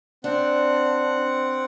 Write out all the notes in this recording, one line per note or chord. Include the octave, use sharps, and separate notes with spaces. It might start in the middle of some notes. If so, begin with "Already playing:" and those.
C4 D4 F#5